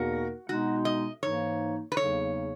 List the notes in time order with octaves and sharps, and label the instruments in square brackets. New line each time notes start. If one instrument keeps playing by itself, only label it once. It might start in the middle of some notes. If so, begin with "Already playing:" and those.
Already playing: [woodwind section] E2 B2 A#3 D#4 A#4 [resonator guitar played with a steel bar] F#4
[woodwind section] B2 G#3 B3 D#4 [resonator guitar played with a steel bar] F#4
[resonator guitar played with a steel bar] D#5
[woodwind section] G#2 E3 A#3 D#4 [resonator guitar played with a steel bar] C#5
[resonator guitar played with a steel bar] B4
[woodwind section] E2 C#3 F#3 A#3 D#4 [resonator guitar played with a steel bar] C#5